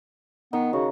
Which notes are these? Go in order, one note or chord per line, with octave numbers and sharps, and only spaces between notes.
D#3 B3
C#3 F#4